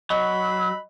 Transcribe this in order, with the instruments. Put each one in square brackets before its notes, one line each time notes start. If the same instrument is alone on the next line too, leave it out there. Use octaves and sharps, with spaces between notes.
[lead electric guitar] F#3 [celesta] D#5 [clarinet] B5